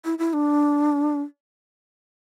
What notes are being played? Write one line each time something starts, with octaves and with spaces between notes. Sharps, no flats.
E4
E4
D4